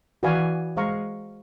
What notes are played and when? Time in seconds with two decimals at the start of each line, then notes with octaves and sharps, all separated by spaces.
0.23 E3 F#4 B4 D5 F5 G#5
0.77 G#3 C5 F5 A#5 C#6